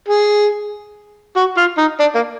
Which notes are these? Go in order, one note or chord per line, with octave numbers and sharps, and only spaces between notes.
G#4
F#4
F4
D#4
D4
A#3